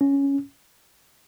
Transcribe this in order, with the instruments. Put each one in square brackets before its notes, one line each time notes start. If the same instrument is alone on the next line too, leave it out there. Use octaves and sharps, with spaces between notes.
[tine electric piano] C#4